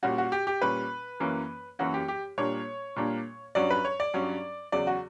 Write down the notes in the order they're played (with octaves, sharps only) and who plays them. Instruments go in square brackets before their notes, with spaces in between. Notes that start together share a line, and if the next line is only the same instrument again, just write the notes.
[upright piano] A#2 G3 C#4 F#4
F#4
G4
G4
A#2 G3 C#4 B4
F#2 E3 A#3 C#4
F#2 E3 A#3 C#4 F#4
G4
G4
A#2 G3 A#3 D4 C#5
A#2 G3 A#3 D4
G2 F#3 C#4 D5
B4
C#5
D5
G2 F#3 C#4
E2 C#3 F#3 D5
F#4